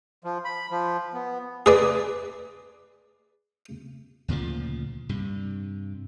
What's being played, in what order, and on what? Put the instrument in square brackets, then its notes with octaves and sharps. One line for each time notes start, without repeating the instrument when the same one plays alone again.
[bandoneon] F3
B5
F3
B3
[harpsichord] G#4 B4 D5
[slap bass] D2 A#2 C#3 F3
G2 C3